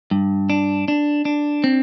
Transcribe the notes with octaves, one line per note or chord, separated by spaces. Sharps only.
G2
D4
D4
D4
C4